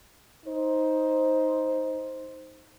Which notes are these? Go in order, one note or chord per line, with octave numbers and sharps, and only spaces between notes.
D#4 C5